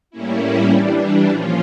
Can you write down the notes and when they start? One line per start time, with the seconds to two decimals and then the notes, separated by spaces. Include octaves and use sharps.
0.10 A2 G3 A#3 C#4 E4
0.70 E3 G3 D4
1.29 A#2 F3 C#4 F4